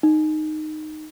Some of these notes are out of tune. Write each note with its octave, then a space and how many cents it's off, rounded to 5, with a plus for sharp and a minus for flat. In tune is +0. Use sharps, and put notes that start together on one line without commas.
D#4 -10